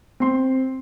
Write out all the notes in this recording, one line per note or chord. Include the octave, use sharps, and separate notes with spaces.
C4 C6